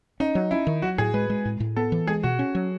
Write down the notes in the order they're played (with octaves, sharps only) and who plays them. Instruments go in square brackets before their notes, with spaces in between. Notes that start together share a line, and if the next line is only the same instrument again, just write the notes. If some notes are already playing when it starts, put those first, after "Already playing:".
[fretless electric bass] C#4 [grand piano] D#4
[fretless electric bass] F#3
[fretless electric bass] C#4 [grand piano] E4
[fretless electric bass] D#3
[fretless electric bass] F#3 [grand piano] F#4
[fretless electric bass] A2 [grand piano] G#4
[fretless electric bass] G#3 [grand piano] B4
[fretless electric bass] G#3
A2
A2
[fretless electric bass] B3 [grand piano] A4
[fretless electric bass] E3
[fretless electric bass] G#3 [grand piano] G#4
[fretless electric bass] B2 [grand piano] F#4
[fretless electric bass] C#4
F#3